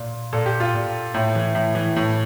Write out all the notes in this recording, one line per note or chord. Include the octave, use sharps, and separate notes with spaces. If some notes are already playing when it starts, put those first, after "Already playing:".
Already playing: A#2
A#2 A4
G4
F4
A#2
A2
E3
A2
E3
A2